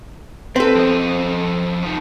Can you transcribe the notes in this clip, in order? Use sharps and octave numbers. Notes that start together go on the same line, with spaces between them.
C4 A4 B4
F3 D#5
F3 D#4